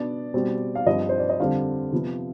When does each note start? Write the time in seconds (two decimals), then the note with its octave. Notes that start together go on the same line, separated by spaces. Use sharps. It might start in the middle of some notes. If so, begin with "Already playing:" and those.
Already playing: B2 B3 D4 D5
0.34 B2 G3 C4
0.75 F5
0.86 G2 F3 C4 D#5
1.09 C5
1.19 D5
1.29 D#5
1.40 F2 D3 G3 C4 F5
1.92 C3 F3 B3